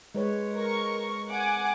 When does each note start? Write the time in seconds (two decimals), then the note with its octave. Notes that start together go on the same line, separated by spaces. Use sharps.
0.15 G#3 B4 C#5
0.55 A#4 C#6
1.30 F#5 G#5 D6